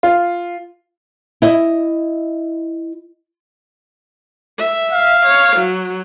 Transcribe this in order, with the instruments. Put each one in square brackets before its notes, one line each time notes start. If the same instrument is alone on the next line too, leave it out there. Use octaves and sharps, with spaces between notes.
[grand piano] F4
[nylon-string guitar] E4 D#5
[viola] E5
[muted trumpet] F5
[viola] C#5
F#3